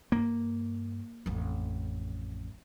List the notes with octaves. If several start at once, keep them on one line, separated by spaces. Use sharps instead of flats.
G2 A#3
A1 F2